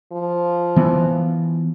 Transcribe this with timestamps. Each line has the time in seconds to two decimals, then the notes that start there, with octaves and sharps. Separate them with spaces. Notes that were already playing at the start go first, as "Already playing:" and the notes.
0.12 F3
0.76 E3 B3